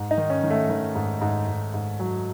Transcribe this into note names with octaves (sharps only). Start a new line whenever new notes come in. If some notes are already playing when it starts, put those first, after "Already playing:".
Already playing: G#2
D#4
D#3
C#4
D#3
A3
D#3
G#2
G#2
G#2
G#2
F#3